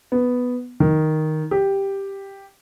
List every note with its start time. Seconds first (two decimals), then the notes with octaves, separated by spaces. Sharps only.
0.12 B3
0.80 D#3
1.51 G4